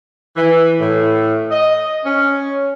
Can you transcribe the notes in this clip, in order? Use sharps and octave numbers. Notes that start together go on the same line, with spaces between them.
E3
A2
D#5
C#4